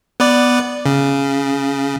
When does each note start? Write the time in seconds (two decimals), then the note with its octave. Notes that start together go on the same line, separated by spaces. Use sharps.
0.20 B3 B4 D5
0.86 C#3